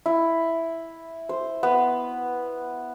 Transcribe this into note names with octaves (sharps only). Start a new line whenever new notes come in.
E4
C5
B3